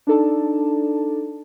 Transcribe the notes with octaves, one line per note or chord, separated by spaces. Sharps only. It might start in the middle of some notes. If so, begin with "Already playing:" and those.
D4 D#4 A4 D5 A5